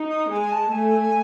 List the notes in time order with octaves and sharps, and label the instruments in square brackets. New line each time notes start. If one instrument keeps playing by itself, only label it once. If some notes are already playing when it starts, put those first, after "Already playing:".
Already playing: [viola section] D#4
[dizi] D#6
[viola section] G#3 [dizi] G#5
[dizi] A5
[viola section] A3 [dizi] G#5